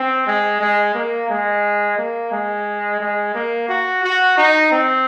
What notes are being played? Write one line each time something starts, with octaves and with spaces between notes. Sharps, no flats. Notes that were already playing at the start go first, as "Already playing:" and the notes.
Already playing: C4
G#3
G#3
A#3
G#3
A#3
G#3
G#3
A#3
F#4
F#4
D#4
C4